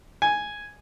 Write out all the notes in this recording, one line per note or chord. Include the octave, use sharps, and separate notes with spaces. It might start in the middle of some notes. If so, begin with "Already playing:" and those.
G#5